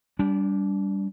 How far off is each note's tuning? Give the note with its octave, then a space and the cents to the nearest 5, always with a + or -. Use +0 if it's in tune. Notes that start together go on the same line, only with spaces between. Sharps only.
G3 +0 D4 -35